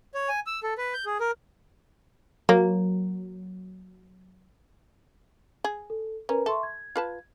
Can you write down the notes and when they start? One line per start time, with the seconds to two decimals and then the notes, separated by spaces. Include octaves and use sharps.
0.14 C#5
0.29 G#5
0.47 E6
0.63 A4
0.78 B4
0.94 G6
1.06 G#4
1.20 A#4
2.49 F#3 A#3
5.64 G#4
5.90 A4
6.29 C#4 A#4 B4 A#5
6.46 A4 E5 C6 C#6
6.63 G#6
6.96 F4 B4 A5